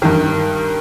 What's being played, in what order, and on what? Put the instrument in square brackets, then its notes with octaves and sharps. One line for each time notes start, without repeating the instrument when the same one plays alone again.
[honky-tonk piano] G2 D#3